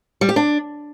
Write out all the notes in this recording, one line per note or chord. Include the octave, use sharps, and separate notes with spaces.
G3
G4
D4